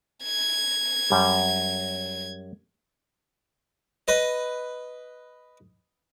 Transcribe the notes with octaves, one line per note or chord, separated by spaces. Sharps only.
G#6
F#2 G3
B4 D#5